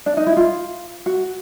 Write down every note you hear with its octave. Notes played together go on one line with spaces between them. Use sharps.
D4
D#4
E4
F4
F#4